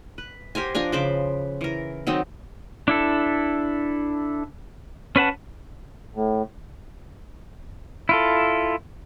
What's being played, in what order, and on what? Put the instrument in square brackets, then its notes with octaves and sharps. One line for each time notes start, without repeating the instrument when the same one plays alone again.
[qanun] B4
G4 A#4 C5 G#5
F3 D4 A#4 G#5
C#3 B4 C5 D6
E3 A#4
D#3 F#3 C4 D#4
[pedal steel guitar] D4 E4 A4
C#4 B4 F#5 A5
[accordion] A2
[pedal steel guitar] E4 F4 A4